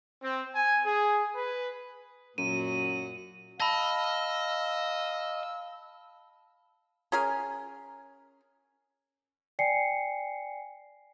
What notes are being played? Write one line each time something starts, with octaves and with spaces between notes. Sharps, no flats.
C4
G#5
G#4
B4
F#2 A#2 F#4 D#7
D#5 F5 A5 B5 E6
C#4 G#4 A#4 G#5
D5 G5 G#5 C7 C#7